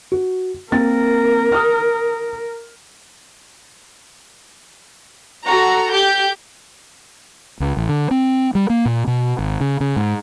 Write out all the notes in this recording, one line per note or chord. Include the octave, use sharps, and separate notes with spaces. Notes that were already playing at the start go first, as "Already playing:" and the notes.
F#4
A#3 C4 A#4 A6
D#6 F6
F#4 A4 A#5
G4 G6
C#2
A1
D3
C4
G3
A#3
A#2
B2
G#1
C#3
C#3
G#2